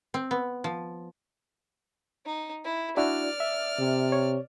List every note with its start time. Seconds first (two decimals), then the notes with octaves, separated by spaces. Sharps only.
0.14 C4
0.31 B3
0.64 F3
2.25 D#4
2.64 E4
2.97 D4 E4 F#4 D5 F6
3.40 E5
3.79 C3
4.12 C#5